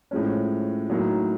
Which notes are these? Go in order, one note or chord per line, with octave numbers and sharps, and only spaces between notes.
A2 F3 G#3 C#4
A2 F#3 A#3 D#4